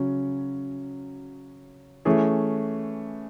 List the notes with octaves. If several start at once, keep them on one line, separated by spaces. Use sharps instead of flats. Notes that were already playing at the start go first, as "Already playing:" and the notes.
Already playing: C#3 F#3 C#4
E3 A3 C#4 G#4